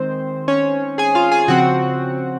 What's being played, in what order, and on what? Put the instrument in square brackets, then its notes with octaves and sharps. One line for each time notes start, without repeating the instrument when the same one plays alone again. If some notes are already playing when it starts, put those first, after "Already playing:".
Already playing: [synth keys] D#3 G#3 C4 C5
C#4 C#5
G#4 G#5
F4 F5
G#4 G#5
C#3 F3 C4 F#4 F#5